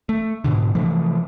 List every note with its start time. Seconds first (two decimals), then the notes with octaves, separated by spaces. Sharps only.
0.09 A3
0.44 G#2 B2 D3
0.75 C3 E3 F3 A3